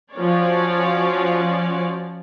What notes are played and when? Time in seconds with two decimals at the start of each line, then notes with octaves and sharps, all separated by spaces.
0.12 F3 C#4 F#4 C#5 D5